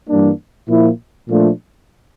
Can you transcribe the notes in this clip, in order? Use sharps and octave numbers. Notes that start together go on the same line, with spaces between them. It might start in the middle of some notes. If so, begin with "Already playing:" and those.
G2 E3 G3 A#3 D4
A#2 F3 A#3 E4
A#2 F3 A3 D4 F4